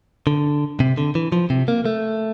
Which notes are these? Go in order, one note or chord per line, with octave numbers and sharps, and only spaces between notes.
D3
C3
D3
E3
F3
C3
A#3
A3